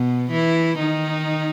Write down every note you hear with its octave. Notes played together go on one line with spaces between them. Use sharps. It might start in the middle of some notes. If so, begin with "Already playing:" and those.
Already playing: B2 B3
E3 E4
D#3 D#4